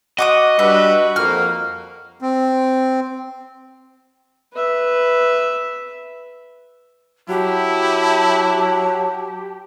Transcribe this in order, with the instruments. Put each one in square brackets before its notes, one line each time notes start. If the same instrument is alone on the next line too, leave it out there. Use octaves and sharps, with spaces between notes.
[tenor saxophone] F#4 [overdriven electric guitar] D#5 [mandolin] F#5 D6 D#6
[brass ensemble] G3 D4 B4 [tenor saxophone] F#4 [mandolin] E5
[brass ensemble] F2 A#3 [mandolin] F6
[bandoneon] C4
[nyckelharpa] B4 E5
[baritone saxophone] F#3 [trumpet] E4 [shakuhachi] G4 [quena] A5